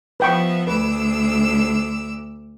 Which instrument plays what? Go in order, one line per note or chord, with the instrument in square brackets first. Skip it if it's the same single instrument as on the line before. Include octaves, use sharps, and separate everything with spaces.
[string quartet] F3 B3 E5 [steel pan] B4 G5 C#6
[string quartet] D2 D6 E6 [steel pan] B4